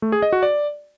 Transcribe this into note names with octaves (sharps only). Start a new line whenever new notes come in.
A3
G#4
D#5
F#4
D5